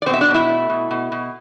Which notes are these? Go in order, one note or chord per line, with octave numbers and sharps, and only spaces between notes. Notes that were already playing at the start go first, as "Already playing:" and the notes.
D5
B2 C4 C5
E5
D4 D5
B2
E4 E5
A3
B2
B2
B2